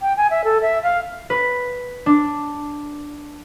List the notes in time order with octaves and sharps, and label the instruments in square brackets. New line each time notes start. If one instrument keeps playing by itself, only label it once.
[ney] G5
G#5
E5
A4
E5
F5
[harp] B4
D4